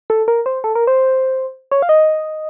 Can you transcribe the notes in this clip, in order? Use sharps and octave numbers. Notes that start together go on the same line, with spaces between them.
A4
A#4
C5
A4
A#4
C5
C#5
F5
D#5